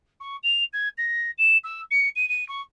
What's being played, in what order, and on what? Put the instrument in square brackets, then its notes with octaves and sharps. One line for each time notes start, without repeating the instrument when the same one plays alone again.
[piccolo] C#6
F7
G#6
A#6
E7
E6
C#7
D#7
D#7
C#6